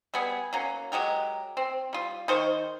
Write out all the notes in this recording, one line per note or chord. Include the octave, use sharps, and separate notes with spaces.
G3 B3 G#4
F#3 A#3 C#4
F#3 G#3 G4 A#4
C4
G3 F4
D#3 C5 C#6